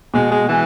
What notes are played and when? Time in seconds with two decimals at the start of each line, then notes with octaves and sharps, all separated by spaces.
0.14 B2 G#3
0.31 G#3
0.49 E3